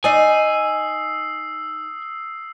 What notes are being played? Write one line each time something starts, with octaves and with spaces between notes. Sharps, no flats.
D#4 D5 D#5 G#5 D#6 E6 C7